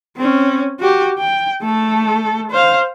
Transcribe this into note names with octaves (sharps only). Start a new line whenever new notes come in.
C4 C#4
F#4 G4
G5
A3 A4
C5 F5